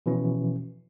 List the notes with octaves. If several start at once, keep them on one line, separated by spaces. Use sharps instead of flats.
B2 E3 F3 C#4